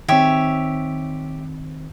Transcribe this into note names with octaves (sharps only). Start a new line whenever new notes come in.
D#3 C4 G4 C#5 E5